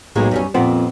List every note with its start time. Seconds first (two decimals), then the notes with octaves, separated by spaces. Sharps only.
0.16 B1 A2 G#3 A#3
0.31 F#2 G3 C#4
0.54 F2 A#2 B3 C4